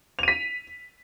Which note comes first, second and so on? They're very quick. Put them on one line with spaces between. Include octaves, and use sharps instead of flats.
F7 D#7 B6